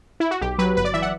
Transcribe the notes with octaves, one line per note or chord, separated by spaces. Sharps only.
E4
F#4
B1 G4
F#3 B4
G1 B4
D5
E3 E5
F#5